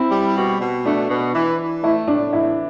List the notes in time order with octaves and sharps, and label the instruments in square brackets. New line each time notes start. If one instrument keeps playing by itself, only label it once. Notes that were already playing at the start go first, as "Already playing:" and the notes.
Already playing: [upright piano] C4 [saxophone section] E4
[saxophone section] G3
B2
B2
[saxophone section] A3 [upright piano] D4
[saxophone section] B2
E3
E3
[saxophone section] A3 [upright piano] E4
[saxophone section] A2 [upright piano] D4
[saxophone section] E3 [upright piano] E4